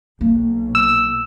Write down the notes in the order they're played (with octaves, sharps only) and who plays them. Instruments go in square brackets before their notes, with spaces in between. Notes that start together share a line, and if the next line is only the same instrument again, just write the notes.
[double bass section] B1 [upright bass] A#3
[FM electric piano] E6